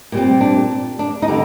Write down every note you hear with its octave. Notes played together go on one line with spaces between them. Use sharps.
A#2 G3 C4
D4
D4
D#4
D3 G3 D4